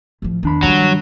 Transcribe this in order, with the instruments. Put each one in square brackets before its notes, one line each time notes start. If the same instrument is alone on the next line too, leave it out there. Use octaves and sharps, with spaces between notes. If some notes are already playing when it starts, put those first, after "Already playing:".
[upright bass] A2 F3
[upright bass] E2 [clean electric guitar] D#3 D4 B5
[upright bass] G2 F3 [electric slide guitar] F#3